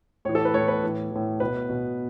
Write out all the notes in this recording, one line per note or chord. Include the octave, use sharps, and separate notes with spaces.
A2 E3 C#5
A4
B4
A2 E3 C#5
B4
A2 E3
A2 E3
B2 B4
B2